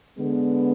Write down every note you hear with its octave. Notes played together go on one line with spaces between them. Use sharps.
D3 G#3 B3